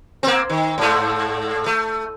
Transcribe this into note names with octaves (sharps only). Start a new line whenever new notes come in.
A#3 C4
D#3
G#2 A3
A3